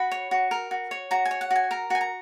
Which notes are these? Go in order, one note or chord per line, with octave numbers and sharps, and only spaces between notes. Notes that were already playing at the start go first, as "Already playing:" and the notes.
Already playing: F#4 B5
C#5
F#4
A#4
F#4
C#5
F#4 A#5
G#5
C#5
F#5
F#4 G#5
A#4 A#5
F#4 G#5
A#5